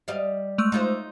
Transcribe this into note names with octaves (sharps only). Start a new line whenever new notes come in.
G3 D#5 F5
G#3 A3 E6
D#4 F4 C5